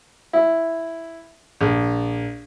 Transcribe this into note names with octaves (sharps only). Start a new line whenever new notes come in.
E4
A#1